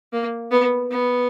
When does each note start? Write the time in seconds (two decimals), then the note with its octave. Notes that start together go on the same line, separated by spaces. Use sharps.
0.13 A#3
0.52 B3
0.91 B3